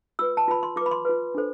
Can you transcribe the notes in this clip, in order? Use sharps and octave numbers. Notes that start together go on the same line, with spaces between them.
F4 B4 E6
A5
F4 B4 B5
C6
F4 D6
B4 B5
C6
F4 B4
D4 A4 C5